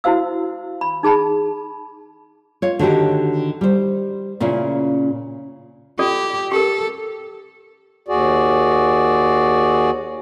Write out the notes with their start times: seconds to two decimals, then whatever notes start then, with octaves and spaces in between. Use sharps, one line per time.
0.04 E4 F#4 C5 F5 E6
0.81 B5
1.03 D#4 G#4 A5 B5
2.62 F4 C#5
2.79 D3 D#3 F#4 G4
3.61 G3 C5
4.40 A#2 C#3 C#4 E4 F4
5.99 F4 G4 A4 D5
6.52 G4 A4 A#4
8.08 D#2 F#4 G#4 D5